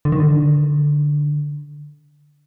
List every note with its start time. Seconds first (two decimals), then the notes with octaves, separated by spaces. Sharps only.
0.05 D3
0.12 D#3
0.20 D3